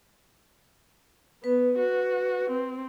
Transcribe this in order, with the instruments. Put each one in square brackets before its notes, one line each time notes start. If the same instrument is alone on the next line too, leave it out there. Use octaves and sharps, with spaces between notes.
[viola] B3 [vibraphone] B4
[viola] F#4
C4